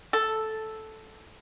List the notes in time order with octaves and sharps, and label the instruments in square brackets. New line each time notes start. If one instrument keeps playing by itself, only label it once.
[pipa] A4